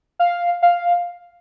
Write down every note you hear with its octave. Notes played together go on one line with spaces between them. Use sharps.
F5
F5